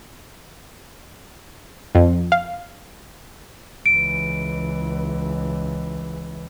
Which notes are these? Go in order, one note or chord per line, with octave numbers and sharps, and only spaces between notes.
F2
F5
C#2 E3 D7